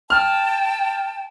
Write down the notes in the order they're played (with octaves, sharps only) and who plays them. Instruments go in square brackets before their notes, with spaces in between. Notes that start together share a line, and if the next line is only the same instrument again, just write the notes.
[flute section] G5 A5 [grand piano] F6